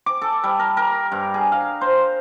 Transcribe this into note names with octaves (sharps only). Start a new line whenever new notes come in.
D6
A4
G3
A#4
A#4
G2
G#4
F5
C5